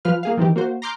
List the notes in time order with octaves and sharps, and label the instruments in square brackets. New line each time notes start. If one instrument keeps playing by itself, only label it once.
[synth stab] F3 F4 B4 F6
A#3 G#4 F5
D#3 E3 C4 G4
A#3 F#4 C5
A#5 C6 D6 F6 G6